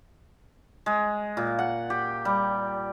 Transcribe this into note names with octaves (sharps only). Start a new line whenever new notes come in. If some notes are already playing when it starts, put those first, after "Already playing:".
G#3
A#2
F#5
G4
G3